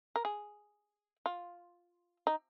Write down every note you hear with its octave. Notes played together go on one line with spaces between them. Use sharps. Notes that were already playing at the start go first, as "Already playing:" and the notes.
A#4
G#4
F4
D#4